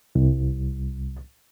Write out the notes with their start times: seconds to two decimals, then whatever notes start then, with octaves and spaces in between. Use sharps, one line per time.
0.15 C2